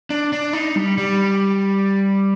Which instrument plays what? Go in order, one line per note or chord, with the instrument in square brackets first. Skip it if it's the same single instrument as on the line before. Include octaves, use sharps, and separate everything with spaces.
[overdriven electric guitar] D4
D4
D#4
G3
G3